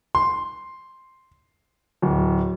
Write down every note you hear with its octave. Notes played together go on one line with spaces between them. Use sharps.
C6
D1